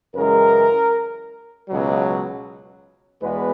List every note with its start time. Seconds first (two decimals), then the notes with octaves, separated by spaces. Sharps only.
0.15 F#2 C#3 E3 G#3 A#4
1.68 C#2 B2 F#3
3.22 E2 B2 G#3 B3 B4